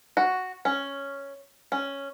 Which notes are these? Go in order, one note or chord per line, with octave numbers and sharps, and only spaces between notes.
F#4
C#4
C#4